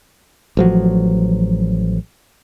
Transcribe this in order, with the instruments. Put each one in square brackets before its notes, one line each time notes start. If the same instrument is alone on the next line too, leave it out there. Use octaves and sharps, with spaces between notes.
[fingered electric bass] A1 F3 F#3